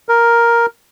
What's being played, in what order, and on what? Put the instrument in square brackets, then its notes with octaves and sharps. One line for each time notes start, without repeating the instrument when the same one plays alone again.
[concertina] A#4